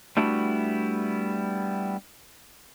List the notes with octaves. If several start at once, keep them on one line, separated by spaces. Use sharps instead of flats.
G3 A3 B3 D4 E4 F#4